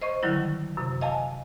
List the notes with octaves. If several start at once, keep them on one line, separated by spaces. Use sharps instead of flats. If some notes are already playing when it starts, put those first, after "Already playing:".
C5 D#5 C#6
D3 D#3 F#3 G3 E4
F#2 C3
D#5 F5 G#5 A5